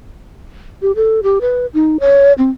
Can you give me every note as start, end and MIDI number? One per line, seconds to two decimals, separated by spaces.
0.82 0.92 67
0.96 1.20 69
1.23 1.39 67
1.41 1.66 71
1.74 1.97 63
2.00 2.33 73
2.38 2.50 60